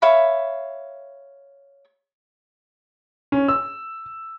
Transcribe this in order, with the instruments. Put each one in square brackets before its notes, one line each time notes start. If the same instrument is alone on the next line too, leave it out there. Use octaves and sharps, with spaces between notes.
[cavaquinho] C#5 E5 F5 B5
[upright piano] C#4
E6